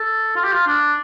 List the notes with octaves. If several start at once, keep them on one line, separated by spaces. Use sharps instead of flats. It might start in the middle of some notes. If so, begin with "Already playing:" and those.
Already playing: A4
F4
G4
F4
D4